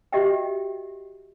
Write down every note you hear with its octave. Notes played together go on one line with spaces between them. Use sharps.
F#4 G4 D#5 E5 F#5 G5